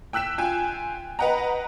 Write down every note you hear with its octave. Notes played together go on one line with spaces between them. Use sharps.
G5 E6 F#6 B6 E7
F4 G5 G#5
B4 D#5 F#5 G5 A#5